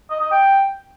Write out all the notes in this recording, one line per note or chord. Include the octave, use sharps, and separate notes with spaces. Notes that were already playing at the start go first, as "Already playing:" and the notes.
D#5
D#5
G5